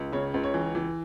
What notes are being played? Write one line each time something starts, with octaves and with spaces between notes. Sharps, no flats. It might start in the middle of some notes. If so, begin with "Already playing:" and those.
Already playing: C#2
C#3 C#5
C#2
C#5
E3
E3